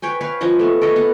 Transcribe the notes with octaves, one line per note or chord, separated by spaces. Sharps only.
B4 C#5 G5 G#5
B4 C#5 F5
F3 C#4 D#5 F#5
A3 B3
A4 C#5 D#5
B3 F#5